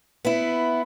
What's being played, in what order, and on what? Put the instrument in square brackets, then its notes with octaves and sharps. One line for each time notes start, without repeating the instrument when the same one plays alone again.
[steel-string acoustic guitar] B3 E4